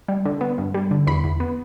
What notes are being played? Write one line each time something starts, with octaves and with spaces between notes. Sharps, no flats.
G3
D3
B3
G2
G3
D3
E2 B5
E2
B3